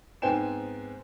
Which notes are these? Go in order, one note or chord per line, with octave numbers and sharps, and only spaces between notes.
G#2 B3 C4 G5 G#5 E7